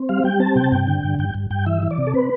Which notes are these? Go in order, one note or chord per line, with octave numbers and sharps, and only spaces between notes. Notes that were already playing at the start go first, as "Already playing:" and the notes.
Already playing: C4
G3 F5
G3 G5
C4 A5
C3 G5
A5
G2 G5
D3
G2
G2 G5
G2
G2 G5
E3 E5
E3
D5
C3
A4
C4 B4